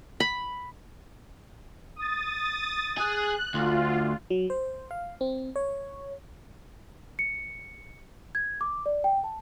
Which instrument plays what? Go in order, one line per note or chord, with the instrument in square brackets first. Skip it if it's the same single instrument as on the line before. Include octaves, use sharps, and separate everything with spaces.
[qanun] B5
[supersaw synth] D#6 A6
[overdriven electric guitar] G#4 [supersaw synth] F#6
[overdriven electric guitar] D2 [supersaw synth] F4
[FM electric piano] F#3
C5
F5
C4
C#5
[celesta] C#7
G#6
D6
D5
G5
A5